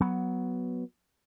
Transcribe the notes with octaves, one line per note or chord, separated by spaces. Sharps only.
F#3 B3